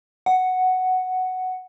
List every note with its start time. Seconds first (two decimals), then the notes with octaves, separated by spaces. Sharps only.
0.26 F#5